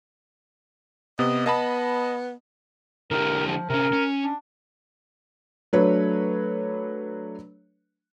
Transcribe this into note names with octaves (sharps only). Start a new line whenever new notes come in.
C3 B3 D#5
B3 D#5 A5 B5
D3 E4 G4 A#4
F3
C3 C#4 A#4
C#4
D4
F#3 A3 D4 B4 C#5